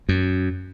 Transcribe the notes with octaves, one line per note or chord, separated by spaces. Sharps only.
F#2